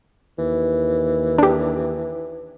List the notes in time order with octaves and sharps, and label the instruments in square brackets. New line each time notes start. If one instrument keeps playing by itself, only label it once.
[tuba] D#2 [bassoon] E3
[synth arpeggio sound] D4 G4